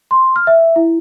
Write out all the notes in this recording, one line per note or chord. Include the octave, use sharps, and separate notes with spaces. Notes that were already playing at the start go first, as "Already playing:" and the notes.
C6
F6
E5
E4